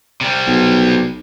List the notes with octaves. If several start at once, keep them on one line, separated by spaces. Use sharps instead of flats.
C3 G3
B1